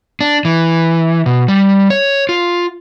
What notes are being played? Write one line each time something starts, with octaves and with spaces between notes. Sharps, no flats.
D4
E3
B2
G3
C#5
F4